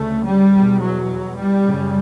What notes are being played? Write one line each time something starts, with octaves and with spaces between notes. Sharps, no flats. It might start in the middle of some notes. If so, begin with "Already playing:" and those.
Already playing: D2 C#3 A3
G3
E2 B2
F#3
G3
F#2 C#3